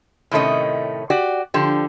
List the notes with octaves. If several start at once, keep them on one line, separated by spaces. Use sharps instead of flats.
A2 C3 D#3 A3 C#4 D#5
F#4 G4 D5
D3 F3 G4